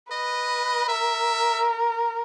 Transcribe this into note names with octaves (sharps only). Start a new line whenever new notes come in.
B4 D#5
A#4 E5